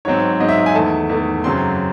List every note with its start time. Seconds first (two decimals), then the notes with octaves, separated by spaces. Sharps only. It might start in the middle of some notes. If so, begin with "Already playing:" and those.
0.05 G#2 F#3 C4 C#5
0.40 G#2 F#3 C4 D#5
0.48 E5
0.66 G#5
0.75 E2 D#3 A3 A5
1.09 E2 D#3 A3
1.44 F#2 C#3 F#3 C4 C6